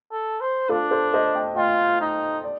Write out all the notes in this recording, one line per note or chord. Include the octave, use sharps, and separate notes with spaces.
A4
C5
D4 F4 A4
A4 C5
C5 D#5
D#5 G5
F4 D#5 G5
D#4
D5